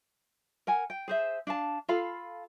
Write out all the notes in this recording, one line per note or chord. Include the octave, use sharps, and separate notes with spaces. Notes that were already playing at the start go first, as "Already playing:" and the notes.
A#4 F#5 G#5
G5
G#4 C5 E5
D4 F5 A5
F4 A4 F5 B5